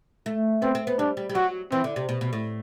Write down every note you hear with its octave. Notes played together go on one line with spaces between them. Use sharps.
A3
B3 C4
C4
B3
G3 D4
G3
G3
F#3 F#4
E3 C4
D3
C3
B2
B2
A2